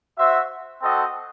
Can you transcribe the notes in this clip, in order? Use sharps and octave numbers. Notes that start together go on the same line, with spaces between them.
F#4 C5 E5
C4 F#4 A4 D#5